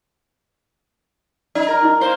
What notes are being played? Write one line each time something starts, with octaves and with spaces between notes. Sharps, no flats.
D#4 D5
A#4
D#4 E4
A#3 C5